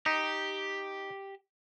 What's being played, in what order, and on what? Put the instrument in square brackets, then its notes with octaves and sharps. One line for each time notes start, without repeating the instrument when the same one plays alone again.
[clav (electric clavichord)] D#4 [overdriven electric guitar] G4